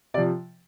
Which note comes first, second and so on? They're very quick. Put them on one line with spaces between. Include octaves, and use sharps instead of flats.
C3 D5 F3